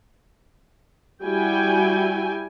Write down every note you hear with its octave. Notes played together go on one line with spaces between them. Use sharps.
G3 E4 F#4 G5 G#5